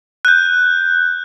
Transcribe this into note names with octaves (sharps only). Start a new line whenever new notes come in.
F#6 G6